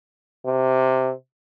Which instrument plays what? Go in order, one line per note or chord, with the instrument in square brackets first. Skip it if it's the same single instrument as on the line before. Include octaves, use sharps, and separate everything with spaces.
[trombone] C3